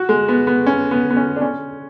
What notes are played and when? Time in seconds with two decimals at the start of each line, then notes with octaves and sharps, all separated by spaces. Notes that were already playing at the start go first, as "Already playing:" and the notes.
Already playing: F#4
0.09 G#3
0.28 B3
0.47 B3
0.66 C#4
0.91 B3
1.10 B3
1.17 C#4
1.36 D4
1.41 C#4